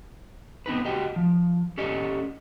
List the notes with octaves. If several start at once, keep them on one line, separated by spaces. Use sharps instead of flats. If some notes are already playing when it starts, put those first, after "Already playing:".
B3 C4 D#4 B4
F#4 G4 D#5 G5
F3
C#4 G4 A4 D5 D#5